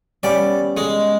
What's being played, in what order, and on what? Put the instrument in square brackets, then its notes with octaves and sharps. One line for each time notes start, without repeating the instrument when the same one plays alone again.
[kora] G3 B3 C#4 [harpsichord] D5
[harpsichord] G#3